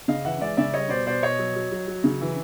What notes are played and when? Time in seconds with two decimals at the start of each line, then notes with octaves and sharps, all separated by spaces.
0.08 C#3 D#5 F5
0.25 E3 E5 F#5
0.41 G#3 D5 E5
0.57 C#3 D5 E5
0.74 G3 C#5 D#5
0.90 B2 C5 D5
1.06 B2 C5 D5
1.22 B2 C#5 D#5
1.39 F#3
1.56 F#3
1.72 F#3
1.88 F#3
2.04 C#3
2.21 E3